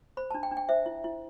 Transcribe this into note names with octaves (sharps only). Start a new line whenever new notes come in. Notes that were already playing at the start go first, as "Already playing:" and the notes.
C5 B5
D4 A5
G5
D4
G5
C5 E5
E4
E4